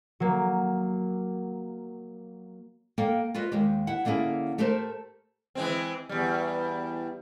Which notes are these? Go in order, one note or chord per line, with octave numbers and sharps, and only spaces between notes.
F#3 A#3
A#3 A4 F5 G5
F4 F#4 B4 D#5
D#2 G#3 G4
E4 F#5
D3 A#3 C#4 E4 G#4
A3 G4 A4 A#4 C5
E3 G#3 C4
E2 G3